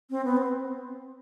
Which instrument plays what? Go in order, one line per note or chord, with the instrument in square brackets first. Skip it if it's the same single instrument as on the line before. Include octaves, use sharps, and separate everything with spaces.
[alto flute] C4
B3
C4